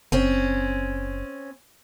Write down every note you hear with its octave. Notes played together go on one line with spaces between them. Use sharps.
F#1 C4 C#4